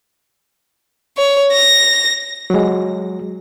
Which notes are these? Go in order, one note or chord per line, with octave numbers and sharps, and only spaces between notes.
C#5
A#6
F#3 G#3